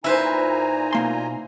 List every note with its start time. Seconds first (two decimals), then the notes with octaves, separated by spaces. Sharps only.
0.04 A#2 D#4 E4 B4 C5 G#5 A#5
0.93 B2 A#3 C6